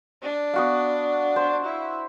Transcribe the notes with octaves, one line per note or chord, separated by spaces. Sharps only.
D4
B3 F#4 F5
C5
E4